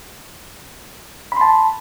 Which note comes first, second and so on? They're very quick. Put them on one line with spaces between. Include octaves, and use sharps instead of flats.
B5 C6 A5